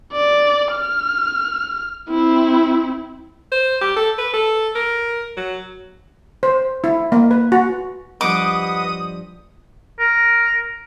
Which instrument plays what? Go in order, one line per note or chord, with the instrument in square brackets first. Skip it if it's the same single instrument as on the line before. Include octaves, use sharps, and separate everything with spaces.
[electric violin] D5
F6
C4 E4
[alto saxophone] C5
G4
A4
B4
A4
A#4
F#3
[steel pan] C5
E4
A#3
B4
F#4
[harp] G2 F3 G6 [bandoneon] B4 D#5 F#5 [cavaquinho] D6 [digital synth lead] D#6
[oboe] A#4